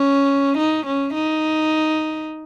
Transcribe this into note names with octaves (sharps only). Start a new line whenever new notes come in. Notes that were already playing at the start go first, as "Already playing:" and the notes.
Already playing: C#4
D#4
C#4
D#4